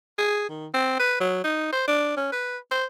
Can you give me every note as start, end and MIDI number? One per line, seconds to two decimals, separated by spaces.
0.18 0.46 68
0.49 0.67 51
0.74 0.95 60
0.99 1.18 71
1.20 1.40 54
1.44 1.70 63
1.72 1.83 72
1.88 2.16 62
2.17 2.28 61
2.32 2.58 71
2.71 2.85 72